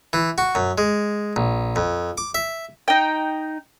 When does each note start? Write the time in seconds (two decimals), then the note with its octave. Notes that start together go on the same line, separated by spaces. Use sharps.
0.13 E3
0.38 F#4
0.55 F#2
0.78 G#3
1.36 A#1
1.76 F2
2.18 D6
2.35 E5
2.88 D#4 G5